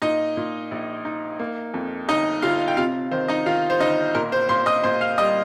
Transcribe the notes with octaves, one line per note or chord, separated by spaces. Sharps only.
A#2 D#4 D#5
A#2
A#1
D#4
A#3
F2
G1 D#4 D#5
G1 F4 F5
G5
C3 F4 F5
D#3 C5
D#4 D#5
D#3 F4 F5
C5
G1 D#4 D#5
A#2 A#4
C5
A#2 C5 C6
D#5 D#6
A#2 C5 C6
F5 F6
G3 D#5 D#6